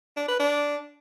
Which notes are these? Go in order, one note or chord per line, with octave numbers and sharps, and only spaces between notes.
D4
B4
D4